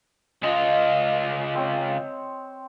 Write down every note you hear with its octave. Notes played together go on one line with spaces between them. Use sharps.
C#3 F4 D#5
C4 C#5